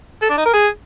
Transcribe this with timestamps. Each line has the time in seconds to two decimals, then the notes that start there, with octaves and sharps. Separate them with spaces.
0.22 A4
0.30 D4
0.38 D#4
0.46 A#4
0.54 G#4